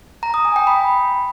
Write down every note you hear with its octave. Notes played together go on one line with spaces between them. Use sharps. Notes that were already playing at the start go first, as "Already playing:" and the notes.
A#5
D#6
G#5
G5
B5